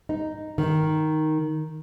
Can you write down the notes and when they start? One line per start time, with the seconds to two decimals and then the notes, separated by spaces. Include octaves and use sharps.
0.09 D#4
0.58 D#3